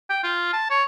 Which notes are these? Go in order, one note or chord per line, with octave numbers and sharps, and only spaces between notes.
G5
F4
A5
C#5